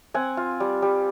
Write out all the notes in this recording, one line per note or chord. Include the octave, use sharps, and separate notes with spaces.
C4 F#5 G#5
F4
G3
G3